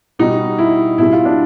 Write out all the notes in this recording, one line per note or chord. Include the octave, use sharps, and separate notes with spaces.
B2 G3 D#4
E4
B2 G3 E4
F4
D4